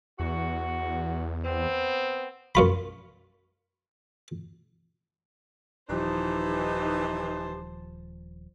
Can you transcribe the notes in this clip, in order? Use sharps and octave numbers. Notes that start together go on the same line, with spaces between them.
E2 F#4
B3 C4
F#2 F4 B5
D#1 E3 F3 D#4 G4 C5 A5